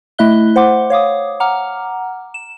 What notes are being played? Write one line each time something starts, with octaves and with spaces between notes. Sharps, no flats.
A3 E4 D#5 E5 F#6 G7
C5 F#5 C6 D6
C#5 F5 D6 D#6
F#5 A#5 D6 F6
E7